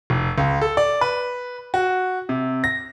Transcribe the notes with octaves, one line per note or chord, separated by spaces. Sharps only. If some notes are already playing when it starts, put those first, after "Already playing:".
F1
C#2
A4
D5
B4
F#4
C3
A#6